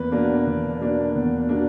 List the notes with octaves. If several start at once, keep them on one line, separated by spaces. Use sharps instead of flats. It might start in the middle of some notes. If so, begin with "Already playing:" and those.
Already playing: E2 A#3 B4
B2 A#3 D4
E2
B2 A#3 D4
E2
B2 A#3 D4